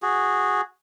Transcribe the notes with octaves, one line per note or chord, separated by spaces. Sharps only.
F#4 G#4